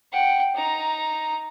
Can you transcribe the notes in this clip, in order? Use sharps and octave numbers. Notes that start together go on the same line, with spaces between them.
F#5 G5
D#4 A#5